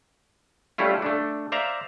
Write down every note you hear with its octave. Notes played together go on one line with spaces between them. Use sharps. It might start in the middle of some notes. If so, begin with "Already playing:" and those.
G3 A3 C#4 E4 F4
A3 D4
C5 D5 E5 F5 A#5